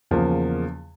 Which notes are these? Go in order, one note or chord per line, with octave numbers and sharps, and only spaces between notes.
E2 C#3 F3 A#3